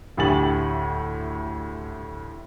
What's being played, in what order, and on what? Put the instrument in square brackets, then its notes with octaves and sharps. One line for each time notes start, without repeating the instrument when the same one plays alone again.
[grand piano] D2 A2 G4 G#5 A6 F#7